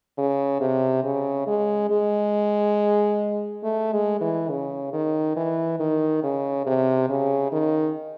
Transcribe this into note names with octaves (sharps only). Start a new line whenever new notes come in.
C#3
C3
C#3
G#3
G#3
A3
G#3
E3
C#3
D#3
E3
D#3
C#3
C3
C#3
D#3